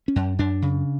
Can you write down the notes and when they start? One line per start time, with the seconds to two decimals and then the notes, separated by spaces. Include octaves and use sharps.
0.08 C#4
0.16 F#2
0.39 F#2 D4
0.62 C#3